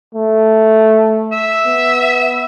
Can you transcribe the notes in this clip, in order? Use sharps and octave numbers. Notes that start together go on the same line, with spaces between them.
A3
E5
B3